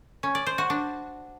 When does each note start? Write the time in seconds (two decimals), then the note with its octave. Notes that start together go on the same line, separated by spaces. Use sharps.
0.23 C#4
0.35 D5
0.47 C5
0.58 F#4
0.70 D4